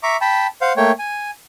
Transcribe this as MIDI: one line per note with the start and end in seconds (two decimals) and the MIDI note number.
0.03 0.17 76
0.03 0.17 82
0.03 0.17 85
0.03 0.17 86
0.21 0.47 79
0.21 0.47 81
0.21 0.47 83
0.61 0.73 72
0.61 0.73 77
0.61 0.73 78
0.77 0.92 57
0.77 0.92 58
0.77 0.92 73
0.77 0.92 79
0.99 1.31 80